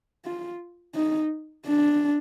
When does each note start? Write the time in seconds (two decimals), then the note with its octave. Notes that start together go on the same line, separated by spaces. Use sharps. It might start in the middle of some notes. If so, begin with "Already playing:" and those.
0.25 F4
0.95 D#4
1.67 D4